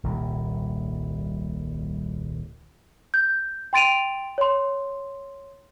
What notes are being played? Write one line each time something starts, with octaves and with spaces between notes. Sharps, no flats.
D#1 C2 A#2
G6
G5 C6 A6 D7 D#7 F7
C#5 C6